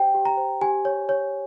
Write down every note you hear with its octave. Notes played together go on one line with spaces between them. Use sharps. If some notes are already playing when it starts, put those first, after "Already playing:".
Already playing: G4 C5 G5
G4
A#5
C5
G4 G#5
C#5
C#5